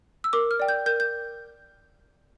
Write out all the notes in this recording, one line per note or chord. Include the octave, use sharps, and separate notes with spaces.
E6
A#4 D6
F6
D5 G5
G6
A#4 G6
G6